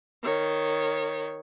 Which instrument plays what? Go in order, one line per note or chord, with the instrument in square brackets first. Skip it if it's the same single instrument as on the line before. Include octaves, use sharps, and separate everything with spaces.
[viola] D#3 C#5